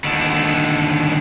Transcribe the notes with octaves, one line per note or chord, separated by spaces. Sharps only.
D#2 D3